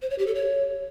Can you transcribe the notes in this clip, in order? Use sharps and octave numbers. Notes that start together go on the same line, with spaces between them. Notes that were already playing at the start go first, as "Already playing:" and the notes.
C5
C#5
G4
A4
C#5